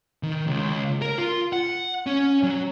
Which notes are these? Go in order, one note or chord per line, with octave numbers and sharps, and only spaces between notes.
D#3
C#2
A#4
F4
F#5
C#4
F#3